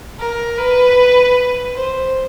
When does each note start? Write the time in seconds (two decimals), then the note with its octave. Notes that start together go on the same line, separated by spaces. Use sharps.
0.19 A#4
0.57 B4
1.75 C5